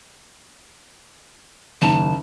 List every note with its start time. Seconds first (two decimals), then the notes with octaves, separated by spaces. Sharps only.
1.82 F#1 D#2 A5